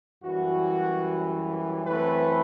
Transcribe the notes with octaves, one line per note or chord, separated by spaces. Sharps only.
F#2 E3 G3 F#4
F#2 E3 A3 C4 B4